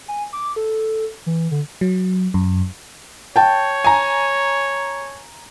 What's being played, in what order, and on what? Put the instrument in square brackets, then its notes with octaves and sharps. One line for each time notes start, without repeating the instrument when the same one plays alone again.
[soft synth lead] G#5
D6
A4
E3
D3
[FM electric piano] F#3
F#2
[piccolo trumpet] C#5 [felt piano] G5 A5
[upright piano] G#5 A#5